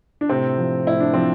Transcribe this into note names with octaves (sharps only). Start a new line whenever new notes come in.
D4
A2 C3 C4
F3
A2 E4
D4
F3 C4